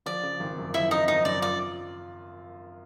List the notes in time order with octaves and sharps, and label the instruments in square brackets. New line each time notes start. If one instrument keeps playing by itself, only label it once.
[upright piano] F3 [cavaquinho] D5
[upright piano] C#3
G#1
F#2
[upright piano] F3 [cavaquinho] E4 E5
[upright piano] C#3 [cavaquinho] D#4 D#5
[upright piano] G#1 [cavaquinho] D#4 D#5
[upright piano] F#2 [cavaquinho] D5
[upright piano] F4 [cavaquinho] D5